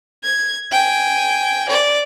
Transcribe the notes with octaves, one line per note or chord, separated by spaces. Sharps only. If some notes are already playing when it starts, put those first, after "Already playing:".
G#6
G5 G#5
D5